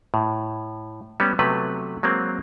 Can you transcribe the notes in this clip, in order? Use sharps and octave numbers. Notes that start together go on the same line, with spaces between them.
A2
G3 B3 C#4
C3 F#3 A3 B3 B4
F#3 G#3 A#3 C4